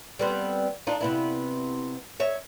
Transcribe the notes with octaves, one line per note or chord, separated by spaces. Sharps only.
G3 B3 C4
D4 D#4 F4
C3 B3 E4
C#5 E5